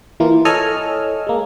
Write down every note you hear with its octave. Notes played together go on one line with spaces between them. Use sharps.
E3 A#3 F4
A4 C#5 D#5 G#5 E6 F6
G#3 A#3